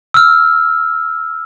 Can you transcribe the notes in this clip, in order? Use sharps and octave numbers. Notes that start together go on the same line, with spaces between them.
E6 F6